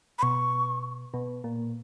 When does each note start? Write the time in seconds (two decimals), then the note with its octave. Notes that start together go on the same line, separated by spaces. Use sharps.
0.19 B5
0.23 B2 C#6
1.14 B2
1.44 A#2